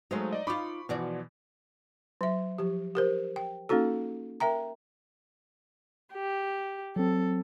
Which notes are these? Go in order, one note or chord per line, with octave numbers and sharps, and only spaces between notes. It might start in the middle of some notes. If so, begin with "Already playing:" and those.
F#3 G#3 A3 D#4 C5 F5
D5 D#5
D#4 F4 B5 C#6 D6
B2 E3 F3 F#4 D5
F#3 E5
F3 G4
G4 A#4 C5
G5
A#3 C#4 D#4 F#4 A4
A#4 E5 G5 A#5
G4
F#3 C4 A4